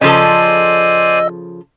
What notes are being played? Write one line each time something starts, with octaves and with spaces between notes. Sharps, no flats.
C#3 F3 A4 C5 D5 D#5 G#5 E6